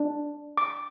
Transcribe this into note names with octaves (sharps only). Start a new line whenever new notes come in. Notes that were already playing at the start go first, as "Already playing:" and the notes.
Already playing: D4
D6